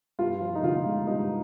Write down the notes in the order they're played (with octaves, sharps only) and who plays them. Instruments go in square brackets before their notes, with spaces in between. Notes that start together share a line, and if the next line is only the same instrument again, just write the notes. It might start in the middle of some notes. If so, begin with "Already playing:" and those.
[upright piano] G2 F4
F3
D#4
D3 F4
G#3
G2 D#4